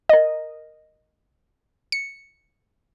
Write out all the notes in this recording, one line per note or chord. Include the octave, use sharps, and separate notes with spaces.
A#4 D#5
C#7